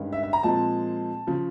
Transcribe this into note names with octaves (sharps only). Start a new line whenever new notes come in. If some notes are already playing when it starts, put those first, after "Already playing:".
Already playing: G2 D#3 G#3 C#4
E5
E5
A#5
A#2 F3 G#3 C4 A5
C#3 F3